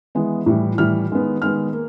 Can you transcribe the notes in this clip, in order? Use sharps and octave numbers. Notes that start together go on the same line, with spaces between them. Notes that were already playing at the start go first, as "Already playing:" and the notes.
E3 G#3 B3
A2 E3 G3
A2 E3 G3 F6
D#3 G#3 B3
D#3 G#3 B3 F6
A#3